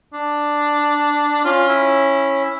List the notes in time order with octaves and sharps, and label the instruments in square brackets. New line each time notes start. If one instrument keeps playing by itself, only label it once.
[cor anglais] D4
[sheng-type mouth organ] C#4 [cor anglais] F4
[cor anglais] E4